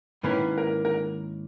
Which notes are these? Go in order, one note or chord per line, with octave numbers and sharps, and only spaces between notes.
G#2 D#3 A#3 C#4 E4 B4
A#4
A#4